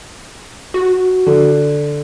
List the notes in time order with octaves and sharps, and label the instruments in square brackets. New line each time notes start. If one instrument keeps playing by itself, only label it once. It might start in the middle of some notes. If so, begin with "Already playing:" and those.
[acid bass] F#4
[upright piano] D3